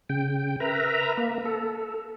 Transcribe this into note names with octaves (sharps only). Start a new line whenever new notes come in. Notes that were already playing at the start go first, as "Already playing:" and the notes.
C#3 G5
A#4 B4 E5 A#5
A#3
A4